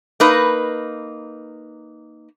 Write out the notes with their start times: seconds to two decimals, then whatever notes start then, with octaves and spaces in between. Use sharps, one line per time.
0.20 A#3 D#4 B4